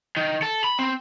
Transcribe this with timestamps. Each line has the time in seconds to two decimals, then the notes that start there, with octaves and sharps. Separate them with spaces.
0.17 D#3
0.42 A4
0.64 B5
0.79 C4